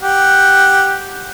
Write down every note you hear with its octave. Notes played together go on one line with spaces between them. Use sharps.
G4 F#5